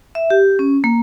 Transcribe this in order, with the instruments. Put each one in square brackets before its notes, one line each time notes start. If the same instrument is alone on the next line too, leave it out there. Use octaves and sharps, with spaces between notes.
[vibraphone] E5
G4
C#4
A#3